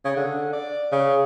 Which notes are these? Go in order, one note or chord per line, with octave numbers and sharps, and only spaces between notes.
C#3
D3
D5
C#3